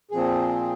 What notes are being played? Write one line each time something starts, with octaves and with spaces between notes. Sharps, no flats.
A#2 F3 C4 G#4